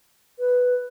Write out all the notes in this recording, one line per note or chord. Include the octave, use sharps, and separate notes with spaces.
B4